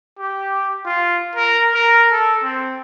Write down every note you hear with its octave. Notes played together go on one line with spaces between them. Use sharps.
G4
F4
A#4
A#4
A4
C4